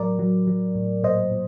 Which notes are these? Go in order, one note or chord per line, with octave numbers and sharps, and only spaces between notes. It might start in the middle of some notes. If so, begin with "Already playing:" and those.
Already playing: A2 F#3 A#4 D5
F#3
F#3
A2
A#2 C5 D#5
A#2